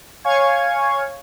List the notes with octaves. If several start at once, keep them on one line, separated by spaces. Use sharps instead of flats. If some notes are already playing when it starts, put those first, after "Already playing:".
C#5 F5 G#5 C#6 G#6